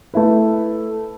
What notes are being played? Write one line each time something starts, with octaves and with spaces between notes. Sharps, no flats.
A3 E4 B4